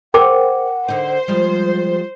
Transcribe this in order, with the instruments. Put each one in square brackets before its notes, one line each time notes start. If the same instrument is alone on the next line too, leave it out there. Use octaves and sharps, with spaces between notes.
[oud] G#4 C5 [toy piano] A#4 G5 D6 [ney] F#5
[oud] D3 D#4 [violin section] C5
[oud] F3 G3 G#3 [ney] F4